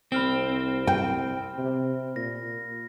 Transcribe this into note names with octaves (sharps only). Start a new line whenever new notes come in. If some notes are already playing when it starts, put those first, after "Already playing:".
C2 C4 B5 F6 G7
G5
C3
A#2 A#6